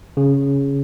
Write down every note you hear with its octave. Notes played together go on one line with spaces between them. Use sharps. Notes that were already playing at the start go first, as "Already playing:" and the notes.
C#3